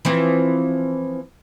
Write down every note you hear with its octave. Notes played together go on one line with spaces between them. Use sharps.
E3 F3 C4